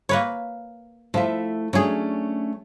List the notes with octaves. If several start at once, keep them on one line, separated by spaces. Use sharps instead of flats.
A#3 B4 C#5
F3 A3 E4 E5
F#3 A3 C#4 D4 G#4